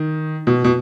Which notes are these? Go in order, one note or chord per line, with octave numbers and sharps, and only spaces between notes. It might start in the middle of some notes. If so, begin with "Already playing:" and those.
Already playing: D#3
B2
B2